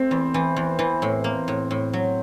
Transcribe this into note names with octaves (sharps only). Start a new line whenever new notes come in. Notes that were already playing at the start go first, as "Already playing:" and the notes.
Already playing: A3 C4
E2
E3
E2
E3
A2
A#3
A2
A2
F#3